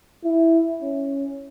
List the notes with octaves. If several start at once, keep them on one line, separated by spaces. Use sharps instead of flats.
E4
C#4